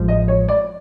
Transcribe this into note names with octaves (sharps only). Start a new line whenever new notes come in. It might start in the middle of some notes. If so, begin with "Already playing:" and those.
Already playing: A1 A2 F3 G#3
D#5
C#5
D5